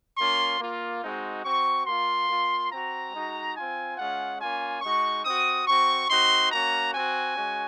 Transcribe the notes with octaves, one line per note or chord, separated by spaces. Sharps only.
A#3 C#4 F4 C6
A#3 F4
G#3 C4 D#4 F#4
C4 F#4 C#6
A#3 F4 C6
A#3 F4
C4 F#4 A#5
G#3 D#4 F#4
C4 F4 G#5
G#3 C#4 F4 F#5
A#3 C#4 F4 G#5
G#3 D#4 F#4 C#6
C4 F#4 D#6
C4 F#4 C#6
C4 D#4 F#4 C6
A#3 C#4 F#4 A#5
C4 F#4 G#5
G#3 C#4 F#4